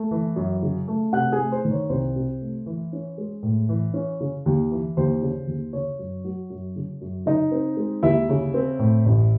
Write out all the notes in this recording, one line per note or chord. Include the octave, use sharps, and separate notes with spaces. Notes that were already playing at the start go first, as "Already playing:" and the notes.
Already playing: A3
E3
F#2
C#3
A3
C3 F#5 F#6
G#4 G#5
A3
C5
D#3
C#5
C2 C5
C3
A3
E3
C#4
G#3
A2
E3
C#4
C#3
D#2
E3
D#2 C5
C#3
D#2
C#3 C#5
F#2
F#3
F#2
C#3
F#2
C#3 D#4 D#5
C4
G#3
D#2 E4 E5
C#3
C4
A2
A1